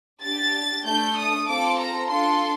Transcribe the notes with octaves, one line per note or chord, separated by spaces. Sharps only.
D4 G4 A6
A3 D4 A4 G6
D#6
C4 F4 A4 D6
A#5
D4 F4 A4 C6